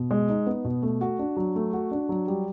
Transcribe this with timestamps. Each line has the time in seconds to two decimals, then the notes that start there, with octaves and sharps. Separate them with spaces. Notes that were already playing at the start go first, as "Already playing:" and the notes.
Already playing: B2
0.11 G#3
0.29 D#4
0.47 B3
0.65 B2
0.82 A3
1.01 F#4
1.19 D4
1.37 F#3
1.56 A3
1.73 F#4
1.91 D4
2.09 F#3
2.28 G3